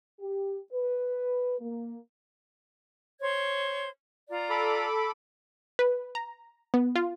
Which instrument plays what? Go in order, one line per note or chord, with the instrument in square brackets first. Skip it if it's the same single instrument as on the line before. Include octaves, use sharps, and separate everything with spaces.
[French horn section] G4
B4
A#3
[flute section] C5 C#5 G#6
F4 D5 A#5
[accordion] A4 B5 D6
[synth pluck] B4
A#5
B3
F4